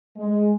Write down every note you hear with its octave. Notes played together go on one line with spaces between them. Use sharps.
G#3